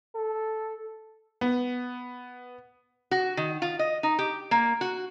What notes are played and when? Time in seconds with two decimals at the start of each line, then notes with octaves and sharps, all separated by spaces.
0.15 A4
1.41 B3
3.11 F#4
3.37 D#3
3.62 F4
3.79 D#5
4.03 D#4
4.19 G4
4.51 A#3
4.81 F#4